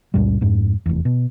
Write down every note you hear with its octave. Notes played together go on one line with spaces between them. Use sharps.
C#2 F#2 A#2 G3
F2 G#2
F1 E2
B2